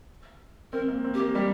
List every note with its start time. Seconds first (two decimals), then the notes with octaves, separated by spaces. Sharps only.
0.73 C4 A#4
0.88 A#3
1.05 C4
1.14 G4
1.20 A#3
1.35 G3 G4